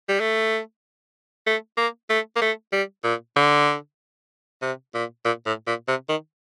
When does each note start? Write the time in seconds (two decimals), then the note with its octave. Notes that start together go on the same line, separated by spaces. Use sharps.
0.09 G3
0.20 A3
1.47 A3
1.77 A#3
2.10 A3
2.36 A#3
2.42 A3
2.73 G3
3.04 A#2
3.36 D3
4.62 C3
4.94 A#2
5.25 A#2
5.46 A2
5.67 A#2
5.88 C3
6.09 D#3